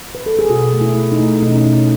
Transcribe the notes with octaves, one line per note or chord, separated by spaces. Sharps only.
B4
A4
G#4
B2 F#4
A3
E4
A3
D#4
A3
B2 D#4
C#4
D#4
B2 C#4